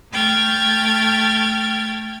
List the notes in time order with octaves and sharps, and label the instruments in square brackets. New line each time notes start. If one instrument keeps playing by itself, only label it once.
[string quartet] A3 G5 F6 G#6 A6